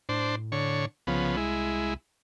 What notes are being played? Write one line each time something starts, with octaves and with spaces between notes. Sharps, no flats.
A2 D4 C5
D3 C#5
C2 C#3 F3 B3
G#3 E4